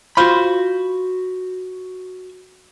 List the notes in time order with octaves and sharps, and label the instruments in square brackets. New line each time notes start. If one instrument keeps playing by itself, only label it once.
[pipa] F4 C5 [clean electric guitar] F#4 B5